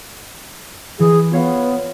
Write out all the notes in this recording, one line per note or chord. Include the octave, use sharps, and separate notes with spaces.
E3 G#4
B3 F4 C#5 F5